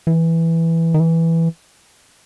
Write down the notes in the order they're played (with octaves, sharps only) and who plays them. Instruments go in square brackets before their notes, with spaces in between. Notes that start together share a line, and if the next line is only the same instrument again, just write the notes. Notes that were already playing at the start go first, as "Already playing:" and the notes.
[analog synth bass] E3
D#3
E3